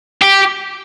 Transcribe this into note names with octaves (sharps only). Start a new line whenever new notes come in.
G4